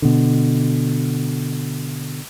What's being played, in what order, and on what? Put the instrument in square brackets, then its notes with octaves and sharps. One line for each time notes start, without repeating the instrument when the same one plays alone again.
[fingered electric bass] B2 D3